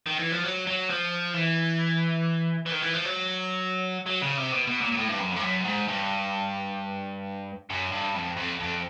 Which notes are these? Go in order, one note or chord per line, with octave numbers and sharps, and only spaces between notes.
D#3
E3
F3
F#3
F#3
F3
E3
E3
D#3
E3
F3
F#3
F#3
C#3
C3
B2
B2
A#2
A#2
A2
G2
F#2
F2
G2
F#2
G#2
G2
F#2
G2
F2
F2
F2